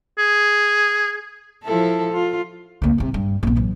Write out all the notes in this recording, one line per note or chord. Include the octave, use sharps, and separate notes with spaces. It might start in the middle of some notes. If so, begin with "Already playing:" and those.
G#4
F3 E4 A4
F4
C#2 A#3
C2 C3
G2
A#1 B3
E3 F#3